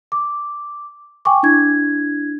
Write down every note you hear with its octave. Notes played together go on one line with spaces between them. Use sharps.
D6
G5 G#5 C#6 D6
D4 E4 G#6